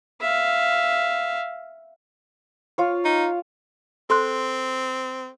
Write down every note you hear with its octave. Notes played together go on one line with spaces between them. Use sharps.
E5 F5
F4 C#5
D#4
C4 A4 C6 F#6